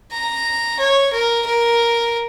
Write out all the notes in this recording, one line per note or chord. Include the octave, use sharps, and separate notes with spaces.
A#5
C#5
A#4
A#4